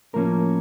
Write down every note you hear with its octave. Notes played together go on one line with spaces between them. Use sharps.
A2 F3 A#3 C#4 A#4